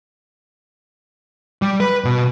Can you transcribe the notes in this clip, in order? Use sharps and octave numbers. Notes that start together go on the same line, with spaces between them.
G3
B4
B2